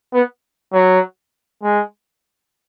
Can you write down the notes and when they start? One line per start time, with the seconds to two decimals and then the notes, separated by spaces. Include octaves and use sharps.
0.13 B3
0.73 F#3
1.63 G#3